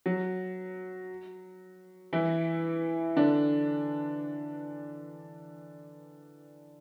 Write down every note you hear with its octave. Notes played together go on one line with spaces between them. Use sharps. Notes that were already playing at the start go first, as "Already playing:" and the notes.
F#3
E3 E4
D3 D4